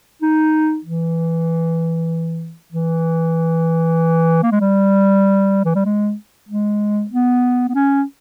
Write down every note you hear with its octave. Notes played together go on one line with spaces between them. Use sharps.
D#4
E3
E3
A#3
G#3
G3
E3
G3
G#3
G#3
B3
B3
C#4